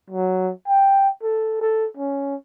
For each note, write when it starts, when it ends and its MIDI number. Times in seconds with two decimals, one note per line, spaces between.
0.10 0.51 54
0.68 1.09 79
1.23 1.57 69
1.61 1.88 69
1.97 2.36 61